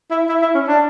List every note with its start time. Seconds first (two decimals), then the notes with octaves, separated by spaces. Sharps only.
0.11 E4
0.29 E4
0.42 E4
0.55 C#4
0.67 D4